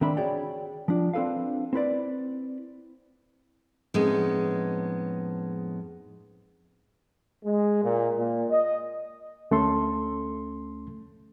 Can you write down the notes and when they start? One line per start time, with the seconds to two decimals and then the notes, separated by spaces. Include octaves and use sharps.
0.01 D#3 C4 D4 E5 B5
0.17 F#4 G#4 C#5 D5 G5
0.88 F3 D4
1.13 C4 D4 A4 B4 F5
1.73 C4 E4 B4 D5
3.94 F2 A2 G#3 B3 C#4 D#4
7.44 G#3
7.83 A#2
8.16 A#2
8.49 D#5
9.51 D2 A3 C#4 A4 C6